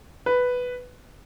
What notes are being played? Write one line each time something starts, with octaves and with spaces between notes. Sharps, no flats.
B4